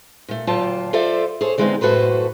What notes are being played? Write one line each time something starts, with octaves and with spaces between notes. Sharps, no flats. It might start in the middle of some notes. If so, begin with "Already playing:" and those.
A#2 A3
D2 A#2 F#3 F4 G5 A5
F4 A4 C5 D5 E5
G#4 A4 C5 C#5
D3 E3 G#3 B3 C4 D#4
F#2 A2 F#4 A4 B4 C5